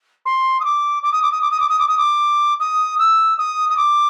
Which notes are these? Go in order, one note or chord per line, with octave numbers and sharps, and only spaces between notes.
C6
D#6
D6
D6
D#6
D6
D#6
D6
D#6
D6
D#6
D6
D#6
D6
D#6
E6
D#6
D#6
D6